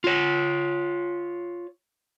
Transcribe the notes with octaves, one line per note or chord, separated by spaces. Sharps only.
F4 C#5